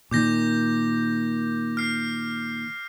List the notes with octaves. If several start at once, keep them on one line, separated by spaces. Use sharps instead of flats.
A#2 D#3 D6 G6 A#6
F6 C7